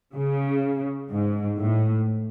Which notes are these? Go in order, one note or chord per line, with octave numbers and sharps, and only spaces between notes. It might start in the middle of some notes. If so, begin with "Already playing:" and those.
C#3
G#2
A2